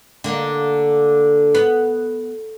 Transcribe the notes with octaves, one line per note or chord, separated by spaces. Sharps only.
D3 A#3
B3